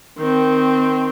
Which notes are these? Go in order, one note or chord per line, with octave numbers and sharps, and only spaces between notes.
D#3 C4